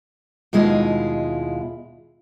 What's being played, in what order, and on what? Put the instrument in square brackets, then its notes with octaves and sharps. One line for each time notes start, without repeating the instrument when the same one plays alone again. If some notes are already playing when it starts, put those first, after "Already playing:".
[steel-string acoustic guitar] D#2 B2 G#3 E4 F4 D#5